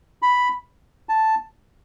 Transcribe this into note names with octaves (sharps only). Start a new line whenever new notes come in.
B5
A5